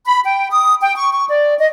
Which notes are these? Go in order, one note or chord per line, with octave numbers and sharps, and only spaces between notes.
B5
G5
D#6
G5
C#6
C#6
D5
D#5